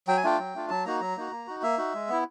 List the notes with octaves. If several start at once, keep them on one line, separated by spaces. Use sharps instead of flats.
F#3 G5
G#5
A3 D4 F4 G5
F#3
A3 D4 F4
F#3 A5
A#3 D#4 F#4 A#5
F#3 A#5
A#3 D#4 F#4
A#3
D#4 F#4
A#3 E5
D#4 F#4
G#3
B3 E4